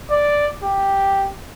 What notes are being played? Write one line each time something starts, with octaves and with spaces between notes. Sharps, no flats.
D5
G4